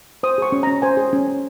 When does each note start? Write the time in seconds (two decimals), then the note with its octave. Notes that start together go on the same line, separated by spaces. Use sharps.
0.23 C5 D#6
0.38 G#4 C#6
0.52 C#4
0.63 C#4 A#5
0.82 C5 G#5
0.97 G#4
1.13 C#4
1.28 C#4